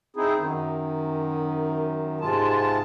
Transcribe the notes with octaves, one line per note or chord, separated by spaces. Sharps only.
C4 D#4 E4 G#4
F#2 D#3
G#2 C3 G#3 F4 A5